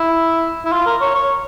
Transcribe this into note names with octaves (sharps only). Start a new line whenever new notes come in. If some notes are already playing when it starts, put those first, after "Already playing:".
Already playing: E4
E4
F4
A#4
C#5
C#5